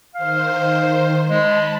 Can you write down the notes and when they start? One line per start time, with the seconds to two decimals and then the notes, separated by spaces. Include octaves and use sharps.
0.15 D#3 C5 F5
1.28 G#3 A5 B5